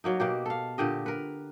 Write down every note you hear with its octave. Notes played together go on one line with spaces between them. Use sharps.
F#3 A#3 D#4
B2 A#3 G4
A4 F5
A#2 D3 G4 D#5
A#4 B4